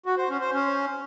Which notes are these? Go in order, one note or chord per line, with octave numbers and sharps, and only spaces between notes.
F#4
C5
C#4
C5
C#4